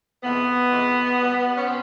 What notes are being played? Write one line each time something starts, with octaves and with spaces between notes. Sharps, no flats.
F2 C3 E3 G#3 B3
F2 C3 E3 G#3
B2 G3
C#4
B2 C4